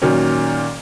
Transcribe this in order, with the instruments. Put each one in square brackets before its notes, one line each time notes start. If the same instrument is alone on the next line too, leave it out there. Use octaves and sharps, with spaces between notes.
[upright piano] A#2 D#3 F#3 C#4